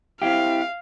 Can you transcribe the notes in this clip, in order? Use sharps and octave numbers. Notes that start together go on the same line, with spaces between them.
C4 E4 G4 F5